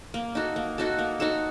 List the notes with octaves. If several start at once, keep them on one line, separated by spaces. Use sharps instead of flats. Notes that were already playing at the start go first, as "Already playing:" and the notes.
A#3
D#4 F#4 A4
A#3
D#4 F#4 A4
A#3
D#4 F#4 A4